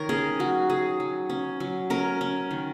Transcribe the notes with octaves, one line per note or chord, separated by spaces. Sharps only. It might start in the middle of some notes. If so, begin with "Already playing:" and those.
Already playing: D#3 A#4 C#5
C#4 G#4
F#3 F#4
F#3 G#4
F#3
C#4
F#3
C#4 A#4
C#4
D#3